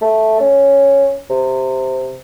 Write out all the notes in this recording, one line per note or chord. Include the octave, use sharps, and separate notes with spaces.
A3
C#4
C3